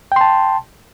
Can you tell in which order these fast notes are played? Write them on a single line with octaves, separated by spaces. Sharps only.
G5 C6 A5